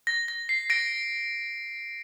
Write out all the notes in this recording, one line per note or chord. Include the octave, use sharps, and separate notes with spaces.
A#6
A#6
C7
A#6 D7